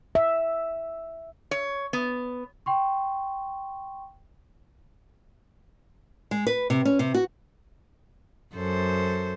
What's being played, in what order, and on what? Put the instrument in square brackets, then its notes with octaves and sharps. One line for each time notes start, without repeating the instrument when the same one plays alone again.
[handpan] E5
[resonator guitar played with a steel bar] C#5
B3
[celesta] G5 C6 C#6
[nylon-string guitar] G#3
B4
C3
C#4
C3
F#4
[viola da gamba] F#2 A4 C5